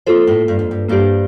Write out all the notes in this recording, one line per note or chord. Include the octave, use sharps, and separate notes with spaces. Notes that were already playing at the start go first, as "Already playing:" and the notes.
F3 A#3 F4 A4 C5
A2
G2
F2
G2
G2 A#3 D4 G4 C5